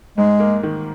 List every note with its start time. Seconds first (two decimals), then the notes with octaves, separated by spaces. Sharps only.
0.18 G#2 G#3
0.40 A#3
0.63 D#3